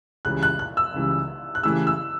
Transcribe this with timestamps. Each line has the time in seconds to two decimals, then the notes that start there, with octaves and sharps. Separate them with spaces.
0.25 C#2 C#3 E3 G3 F#6
0.43 F#6
0.59 F#6
0.77 E6
0.94 C#2 C#3 E3 G3
1.55 F#6
1.63 C#3 E3 A3 E4 G4 E6
1.87 E6